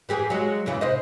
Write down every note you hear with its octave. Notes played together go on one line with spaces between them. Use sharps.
E3 G4 G#4
F#3 G#3
E2 C#3 E3
C3 C5 D#5